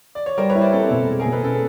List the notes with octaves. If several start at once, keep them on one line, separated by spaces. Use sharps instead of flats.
D5
C#5
G3 A#4 C5
B4 C#5
E4
C5 D5
C4 A4
B2 A4
G#3
G#4 A#4
B2
A4 B4
C#4 A4